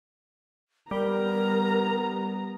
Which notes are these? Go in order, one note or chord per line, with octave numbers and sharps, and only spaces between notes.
G3 B3 A#4 A#5